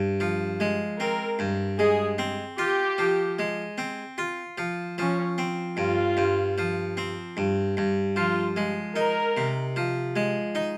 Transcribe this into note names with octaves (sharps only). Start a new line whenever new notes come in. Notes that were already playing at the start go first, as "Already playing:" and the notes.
Already playing: G2
F3
G#3
C4 A#4
G2
G#3 G#4
C4
F4 G4
F3
G#3
C4
F4
F3
F3 C#4
C4
G2 F4
G2
F3
C4
G2
G2
F3 F4
G#3
D#4 A#4
C3
F3
G#3
D#4